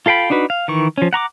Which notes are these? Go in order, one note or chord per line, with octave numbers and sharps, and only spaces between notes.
F4 A4 F5 G5 B5
D4 D#4 F#4 B4
F5
D#3 E3 C#6
F3 C#4
F#5 A#5 C#6 D6